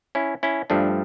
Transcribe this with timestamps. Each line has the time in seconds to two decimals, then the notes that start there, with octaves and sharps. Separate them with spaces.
0.15 C#4 E4
0.43 C#4 E4
0.70 G2 F3 A3 D4